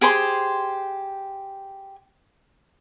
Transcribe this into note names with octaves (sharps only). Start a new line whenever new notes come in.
G4 G#4 C5 C6